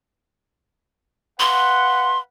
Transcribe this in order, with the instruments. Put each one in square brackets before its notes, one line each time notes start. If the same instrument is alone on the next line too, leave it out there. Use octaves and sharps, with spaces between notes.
[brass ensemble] B4 F5 F#5 [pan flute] C6